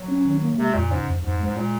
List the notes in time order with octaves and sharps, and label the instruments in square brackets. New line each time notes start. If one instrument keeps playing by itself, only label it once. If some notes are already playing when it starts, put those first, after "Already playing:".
Already playing: [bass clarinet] F#3
[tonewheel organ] C#4
D#3
A#3
[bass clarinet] C3 [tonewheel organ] G#3
[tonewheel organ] F2 [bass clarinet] A#2
[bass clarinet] G#2 [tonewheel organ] C#3
[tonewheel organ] F2
[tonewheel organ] F2 [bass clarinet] G#2
[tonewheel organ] G#3
[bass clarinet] G#2
[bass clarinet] A#2 [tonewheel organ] G#3